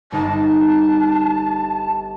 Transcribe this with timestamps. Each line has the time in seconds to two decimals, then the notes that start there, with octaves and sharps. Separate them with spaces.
0.12 G1 D#4 A5